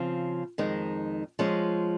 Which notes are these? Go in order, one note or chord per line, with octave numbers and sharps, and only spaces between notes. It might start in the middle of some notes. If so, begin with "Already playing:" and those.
Already playing: C#3 F3 C4
F2 D#3 G#3 D#4
F3 G#3 C#4